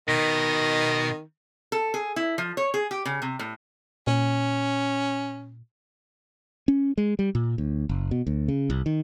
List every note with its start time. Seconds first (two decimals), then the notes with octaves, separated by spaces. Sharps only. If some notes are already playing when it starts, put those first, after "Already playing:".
0.08 B2 D#3 D#5
1.72 A4
1.94 G#4
2.16 E4
2.38 F3
2.57 C#5
2.74 G#4
2.91 G4
3.05 C#3
3.22 C3
3.39 A2
4.07 A#2 C#4
6.68 C#4
6.98 G#3
7.19 G3
7.35 A#2
7.58 D2
7.89 F#1
8.11 B2
8.27 D2
8.48 C#3
8.70 C2
8.86 D#3